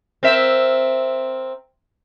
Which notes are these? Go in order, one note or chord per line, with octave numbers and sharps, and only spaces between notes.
C4 A#4 E5